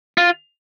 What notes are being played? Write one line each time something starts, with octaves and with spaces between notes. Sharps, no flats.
F4